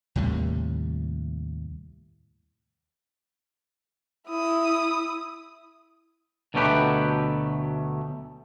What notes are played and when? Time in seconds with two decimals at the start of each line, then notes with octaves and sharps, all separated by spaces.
0.16 D#2 A2 C3 G3
4.28 E4 D#6
6.54 D2 B2 F#3 A3 G4 B4